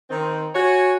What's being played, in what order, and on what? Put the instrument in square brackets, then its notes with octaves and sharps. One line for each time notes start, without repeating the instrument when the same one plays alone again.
[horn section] D#3 C4
F#4 C#5 G#5